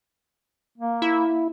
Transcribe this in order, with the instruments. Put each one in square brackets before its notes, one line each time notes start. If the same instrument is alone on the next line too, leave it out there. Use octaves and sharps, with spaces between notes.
[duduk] A#3
[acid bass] E4